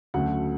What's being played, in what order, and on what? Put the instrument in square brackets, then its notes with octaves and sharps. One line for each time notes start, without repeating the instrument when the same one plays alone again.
[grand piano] D2 C#3 F#3 A3 F#5